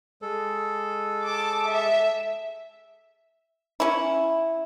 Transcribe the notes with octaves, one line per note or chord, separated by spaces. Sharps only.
G#3 A4
A5 D6
E5
C#4 E4